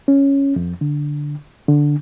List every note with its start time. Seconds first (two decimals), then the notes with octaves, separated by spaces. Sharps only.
0.08 C#4
0.56 F2
0.81 D3
1.68 D3